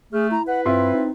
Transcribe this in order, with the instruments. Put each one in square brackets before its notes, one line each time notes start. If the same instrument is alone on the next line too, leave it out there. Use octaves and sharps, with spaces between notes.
[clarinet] A3 [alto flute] G#4 [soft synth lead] F6
[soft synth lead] E4 [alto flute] A#5
[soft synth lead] E4 [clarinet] B4 [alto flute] F#5
[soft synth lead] G2 [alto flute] C4 [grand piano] E4 F4 C6
[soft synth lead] D#4